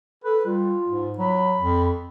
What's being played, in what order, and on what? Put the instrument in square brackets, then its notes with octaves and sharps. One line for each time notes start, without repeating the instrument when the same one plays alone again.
[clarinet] A4 [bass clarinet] B4
[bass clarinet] G3 [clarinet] F4
[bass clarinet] G#2
[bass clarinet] F#3 [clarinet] B5
[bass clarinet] F2